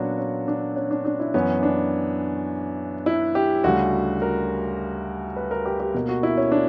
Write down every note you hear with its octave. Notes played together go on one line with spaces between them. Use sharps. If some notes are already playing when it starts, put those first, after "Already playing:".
Already playing: A#2 F#3 B3 C#4 D4 F#4
C#4
D4
C#4
D4
D4
E4
F#2 E3 B3 C#4
D4
E4
G4
D2 C#3 G3 F#4
A#4
B4
A#4
G4
G4
B2 A#3
F#4
E4
C#4
D4